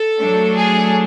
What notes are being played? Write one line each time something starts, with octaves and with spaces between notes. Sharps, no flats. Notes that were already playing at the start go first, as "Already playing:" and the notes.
Already playing: A4
F#3 A3 D4
G#4